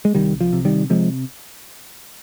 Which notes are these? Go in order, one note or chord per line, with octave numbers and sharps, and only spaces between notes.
G#3
C2 D#3 G3
F3
C3
D#3 G3
C3 F3 G#3